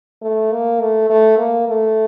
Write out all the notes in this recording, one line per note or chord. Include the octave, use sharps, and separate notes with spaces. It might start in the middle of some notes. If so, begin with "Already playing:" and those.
A3
A#3
A3
A3
A#3
A3